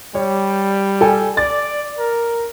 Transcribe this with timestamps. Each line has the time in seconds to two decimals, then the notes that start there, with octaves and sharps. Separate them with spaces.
0.15 G3 C#5
1.01 A4 G5 G#5
1.37 D5 A6
1.99 A#4